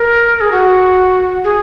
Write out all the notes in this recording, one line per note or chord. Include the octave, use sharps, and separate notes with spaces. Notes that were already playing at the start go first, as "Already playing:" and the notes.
Already playing: A#4
G#4
F#4
G#4